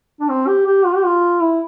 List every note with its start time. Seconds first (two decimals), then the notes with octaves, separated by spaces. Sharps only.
0.20 D4
0.29 C4
0.47 G4
0.66 G4
0.85 F4
0.96 G4
1.05 F4
1.41 E4